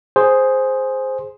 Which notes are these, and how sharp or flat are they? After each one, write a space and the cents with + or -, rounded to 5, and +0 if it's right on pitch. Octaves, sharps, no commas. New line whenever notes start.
G#4 +0 C5 +0